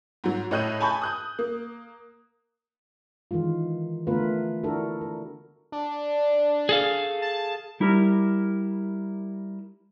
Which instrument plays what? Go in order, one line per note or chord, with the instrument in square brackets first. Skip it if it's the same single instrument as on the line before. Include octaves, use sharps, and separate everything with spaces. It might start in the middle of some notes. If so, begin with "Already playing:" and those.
[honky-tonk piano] G#2 F#3
A2 C#5 D#5 F#6 G6 D#7
G#5 A5 B5 C#6 G6
D#6 F#6 G6
A#3
[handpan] D#3 E3 G#3 F4
D3 A3 B3 F4 A#4 B4
D4 E4 F#4 A4 A#4
A#4
[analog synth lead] D4
[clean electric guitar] G#4 A4 F5
[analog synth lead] A5
[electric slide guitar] G3 E4 G4 A#4